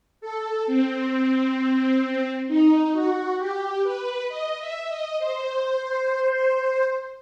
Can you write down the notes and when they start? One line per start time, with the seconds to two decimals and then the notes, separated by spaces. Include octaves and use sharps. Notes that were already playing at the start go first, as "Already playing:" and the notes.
0.21 A4
0.66 C4
2.48 D#4
2.93 F#4
3.38 G4
3.83 B4
4.28 D#5
4.59 E5
4.88 D#5
5.19 C5